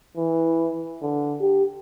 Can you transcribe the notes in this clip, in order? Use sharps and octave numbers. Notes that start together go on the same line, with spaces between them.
E3
D3
G4